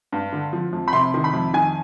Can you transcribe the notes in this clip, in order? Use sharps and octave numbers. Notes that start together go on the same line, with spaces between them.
G2
D3
F3
F2
B5
C3 C6
D#3
B5
F2
D#3 G#5